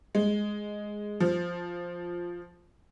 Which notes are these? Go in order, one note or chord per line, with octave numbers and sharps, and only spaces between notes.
G#3
F3